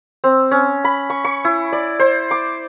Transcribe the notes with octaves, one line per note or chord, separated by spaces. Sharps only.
C4
C#4
B5
C#6
C#6
E4
D5
C5
D6